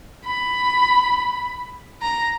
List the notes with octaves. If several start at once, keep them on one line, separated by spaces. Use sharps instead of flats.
B5
A#5